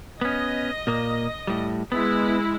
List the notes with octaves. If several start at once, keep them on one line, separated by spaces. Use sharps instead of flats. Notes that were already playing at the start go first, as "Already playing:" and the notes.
B3 C#4 D#5
A#2 A#3
A2 G3
G#3 B3 E4